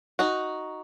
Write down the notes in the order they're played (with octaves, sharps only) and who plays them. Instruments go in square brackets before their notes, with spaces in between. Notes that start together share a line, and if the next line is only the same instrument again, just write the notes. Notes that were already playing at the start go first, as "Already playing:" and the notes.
[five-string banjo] D#4 F#4